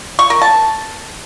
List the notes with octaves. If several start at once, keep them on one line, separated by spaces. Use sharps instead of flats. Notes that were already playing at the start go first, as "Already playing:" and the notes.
C#6
A#4
A5